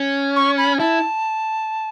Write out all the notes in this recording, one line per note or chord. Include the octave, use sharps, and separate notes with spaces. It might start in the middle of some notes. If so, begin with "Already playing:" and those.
Already playing: C#4
C#6
B5
E4 A5